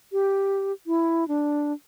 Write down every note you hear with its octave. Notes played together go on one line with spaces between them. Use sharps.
G4
E4
D4